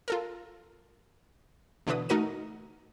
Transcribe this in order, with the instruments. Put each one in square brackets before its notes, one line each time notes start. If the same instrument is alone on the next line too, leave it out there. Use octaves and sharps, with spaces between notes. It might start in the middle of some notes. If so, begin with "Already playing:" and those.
[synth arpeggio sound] F4 A4 A#4
B2 D3 E3 B4 D#6
A3 D#4 F#4 A#4 D#7